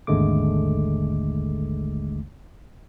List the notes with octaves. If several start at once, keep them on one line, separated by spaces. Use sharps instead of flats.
G#1 D#2 D3 G#3 A3 D6